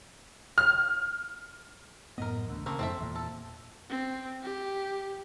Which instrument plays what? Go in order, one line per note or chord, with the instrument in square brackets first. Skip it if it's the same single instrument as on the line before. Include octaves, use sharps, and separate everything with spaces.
[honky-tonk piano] F6
[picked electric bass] F#2 A2 B3 [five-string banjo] A#4 D#5
[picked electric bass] A1 D2 D3
[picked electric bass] C#3 [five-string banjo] A3 A#3 C4
[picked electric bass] F1 F2 G#2 [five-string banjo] C4 A4 E5
[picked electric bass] E2 G2 A#2
[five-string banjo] A4
[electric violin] C4
G4